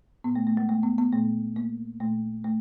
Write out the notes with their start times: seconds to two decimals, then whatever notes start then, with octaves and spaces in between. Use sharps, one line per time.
0.24 A#2 B3
0.35 A3
0.47 A3
0.57 G#3
0.69 A3
0.83 B3
0.98 B3
1.13 A#2 A3
1.56 A#3
2.00 A#2 A3
2.44 A3